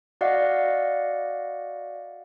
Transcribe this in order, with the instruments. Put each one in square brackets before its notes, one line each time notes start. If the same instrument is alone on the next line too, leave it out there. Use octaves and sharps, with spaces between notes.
[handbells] F#4 D5 D#5 F5 F#5